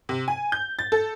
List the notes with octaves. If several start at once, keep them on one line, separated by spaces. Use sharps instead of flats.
C3
G#5
G6
A6
A4